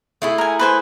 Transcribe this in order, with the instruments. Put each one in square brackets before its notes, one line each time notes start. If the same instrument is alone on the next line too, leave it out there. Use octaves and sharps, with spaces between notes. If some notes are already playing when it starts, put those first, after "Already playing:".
[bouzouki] A3 E4 G#4
[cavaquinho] A#4 G#5
B4 C5 G#5